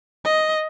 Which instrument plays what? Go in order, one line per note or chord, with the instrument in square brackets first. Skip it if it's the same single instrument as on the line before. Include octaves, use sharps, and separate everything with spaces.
[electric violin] D#5